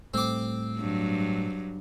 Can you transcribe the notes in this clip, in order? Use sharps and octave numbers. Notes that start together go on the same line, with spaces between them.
A2 G3 A3 C4 D6
G2 F#3